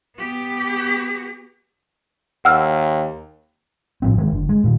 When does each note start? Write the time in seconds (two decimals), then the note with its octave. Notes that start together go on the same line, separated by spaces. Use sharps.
0.17 B3 G4
2.45 D#2 F#5 E6 F6
4.02 A2 F3 C4
4.18 D#3 E3 G#3
4.31 F#1 D3
4.49 G#3
4.64 A#2 D#3